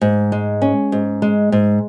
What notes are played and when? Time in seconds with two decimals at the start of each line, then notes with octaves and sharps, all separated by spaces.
0.01 G#2
0.32 G#3
0.62 C#4
0.92 G#2
1.22 G#3
1.52 G#2